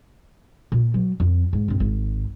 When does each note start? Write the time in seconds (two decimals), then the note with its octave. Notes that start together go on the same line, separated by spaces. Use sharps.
0.72 A#2
0.94 F#3
1.20 F2
1.53 G#2
1.68 G2 C4
1.80 G#1